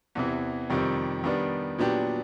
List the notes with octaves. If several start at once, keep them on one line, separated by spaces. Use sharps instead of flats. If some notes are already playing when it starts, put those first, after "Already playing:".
E2 C3 E3
F2 C3 D#3 G3
D#3 G3 B3 D4
A#2 F#3 B3 D4 G4